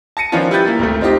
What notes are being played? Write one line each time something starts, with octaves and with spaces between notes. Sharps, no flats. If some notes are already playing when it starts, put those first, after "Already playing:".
A5 A#6 C#7 D#7
D#3 F3 B3 C#4 D4 F4
G3 E4 B4 G5 G6 A6
A#3 E4
G#1 D2 A3
C4 D#4 F4 G4 D#5